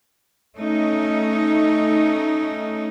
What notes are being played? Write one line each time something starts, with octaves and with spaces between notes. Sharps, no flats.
A3 C#4 D#4